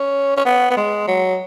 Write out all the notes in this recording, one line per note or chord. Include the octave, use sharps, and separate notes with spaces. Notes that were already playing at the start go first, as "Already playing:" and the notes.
Already playing: C#4
C#4
B3
B3
G#3
F#3